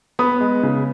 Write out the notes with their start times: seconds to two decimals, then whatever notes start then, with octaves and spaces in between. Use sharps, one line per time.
0.19 B3 B5 D#6
0.41 G#3
0.63 C#3